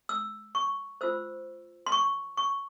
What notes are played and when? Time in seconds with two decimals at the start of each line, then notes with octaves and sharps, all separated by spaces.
0.09 E6
0.55 C#6
1.01 F4 C5 E6
1.86 C6
1.92 C#6
2.37 C#6